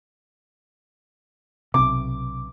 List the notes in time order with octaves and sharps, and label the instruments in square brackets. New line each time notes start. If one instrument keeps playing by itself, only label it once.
[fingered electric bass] B1 C3 [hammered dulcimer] D6